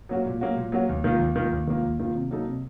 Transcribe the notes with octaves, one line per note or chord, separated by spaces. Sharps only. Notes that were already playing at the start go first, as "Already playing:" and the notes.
F#3 A#3 C#4 F#4
A#2
F#3 A#3 C#4 F#4
A#2
F#3 A#3 C#4 F#4
D#2
D#3 A#3 F4
D#2
D#3 A#3 F4
D#2
D#3 A#3 F4
D#2
D#3 A#3 F4
C3
F#3 A#3 D#4 A4
C3